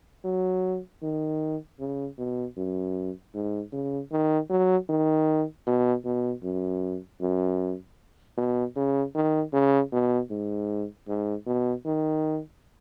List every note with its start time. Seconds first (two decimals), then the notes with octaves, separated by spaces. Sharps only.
0.25 F#3
1.03 D#3
1.80 C#3
2.18 B2
2.57 F#2
3.34 G#2
3.73 C#3
4.12 D#3
4.50 F#3
4.89 D#3
5.67 B2
6.05 B2
6.44 F#2
7.21 F#2
8.37 B2
8.76 C#3
9.15 D#3
9.53 C#3
9.92 B2
10.31 G#2
11.08 G#2
11.46 B2
11.86 D#3